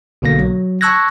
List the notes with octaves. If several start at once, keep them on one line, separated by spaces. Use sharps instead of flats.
B1 B2 D3 A#3 A#6
F#3
A5 C#6 E6 F#6 G#6 A#6